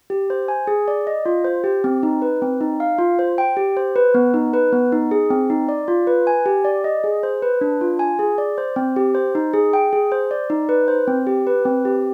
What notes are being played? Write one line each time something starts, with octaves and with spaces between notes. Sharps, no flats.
G4
C5
G#5
G#4
D5
D#5
F4
C5
G4
C4
D#4
B4
C4
D#4
F5
F4
C5
G5
G4
C5
B4
B3
D#4
B4
B3
D#4
G#4
C4
D#4
D5
F4
B4
G#5
G4
D5
D#5
G#4
C5
B4
D4
F4
G#5
G#4
D5
C5
C4
G4
C5
D#4
G#4
G5
G#4
C5
D5
D#4
B4
C5
C4
G4
B4
C4
G4